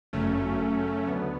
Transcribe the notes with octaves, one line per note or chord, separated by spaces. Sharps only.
G1 F#2 C#3 F#3 A3 C#4
F#2 C#3 F#3
D2 D3 F#3 B3